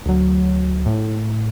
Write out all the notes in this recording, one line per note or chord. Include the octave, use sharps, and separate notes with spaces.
D2 F#3
A2